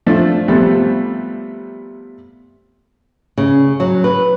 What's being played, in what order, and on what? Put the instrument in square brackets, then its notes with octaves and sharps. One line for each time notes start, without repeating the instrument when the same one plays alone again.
[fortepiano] F3 A3 D4
C3 F3 G3 A3 B3
[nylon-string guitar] C#3
F#3
B4